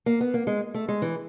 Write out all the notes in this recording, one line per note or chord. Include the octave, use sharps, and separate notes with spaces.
A#3
B3
A#3
G#3
A3
G#3
E3